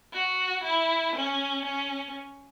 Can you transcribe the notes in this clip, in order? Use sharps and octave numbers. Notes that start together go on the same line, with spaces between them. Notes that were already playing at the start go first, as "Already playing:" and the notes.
F#4
E4
C#4
C#4